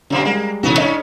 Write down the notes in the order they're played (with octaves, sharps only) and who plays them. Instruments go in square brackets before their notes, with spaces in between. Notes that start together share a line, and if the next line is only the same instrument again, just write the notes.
[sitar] F#2 B2 A#3 [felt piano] D3 D4
[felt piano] G3 G#3 [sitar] A#3
[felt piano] B1 C#3 E3 [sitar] G#2 B3 F#4
[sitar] G#2 C#4 [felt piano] D4 D#5